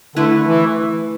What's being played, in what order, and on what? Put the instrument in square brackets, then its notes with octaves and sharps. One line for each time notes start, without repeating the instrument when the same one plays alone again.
[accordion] D3 [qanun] A3 E4 B4
[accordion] E3